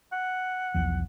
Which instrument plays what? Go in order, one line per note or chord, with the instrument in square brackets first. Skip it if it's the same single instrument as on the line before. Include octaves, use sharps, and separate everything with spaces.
[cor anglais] F#5
[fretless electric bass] B1 E2 F3